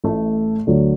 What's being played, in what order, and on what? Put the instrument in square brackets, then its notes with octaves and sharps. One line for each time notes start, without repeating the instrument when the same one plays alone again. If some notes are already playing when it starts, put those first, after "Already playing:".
[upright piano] A1 A2 A3
D2 D3 F#3